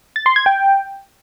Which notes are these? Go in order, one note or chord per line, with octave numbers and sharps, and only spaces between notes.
A6
C6
G#6
G5